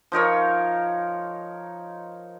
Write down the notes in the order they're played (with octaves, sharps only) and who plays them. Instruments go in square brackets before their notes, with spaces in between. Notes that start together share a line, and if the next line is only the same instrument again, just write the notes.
[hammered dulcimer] F3 D#4 A#4 C#5